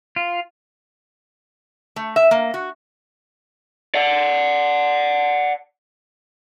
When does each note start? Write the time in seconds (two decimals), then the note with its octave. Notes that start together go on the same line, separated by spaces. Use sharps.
0.16 F4
1.96 A3
2.16 E5
2.31 A#3
2.54 F#4
3.94 D5 F#5